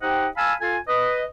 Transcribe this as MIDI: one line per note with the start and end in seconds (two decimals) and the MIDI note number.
0.02 0.27 63
0.02 0.27 67
0.02 0.27 72
0.02 0.27 75
0.02 0.27 78
0.02 0.27 79
0.37 0.53 77
0.37 0.53 80
0.37 0.53 81
0.37 0.53 83
0.37 0.53 88
0.61 0.78 65
0.61 0.78 69
0.61 0.78 77
0.61 0.78 80
0.88 1.24 71
0.88 1.24 75